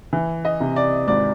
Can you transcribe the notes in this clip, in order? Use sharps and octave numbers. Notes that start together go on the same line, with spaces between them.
E3
D#5
C3
D5
G#1 D5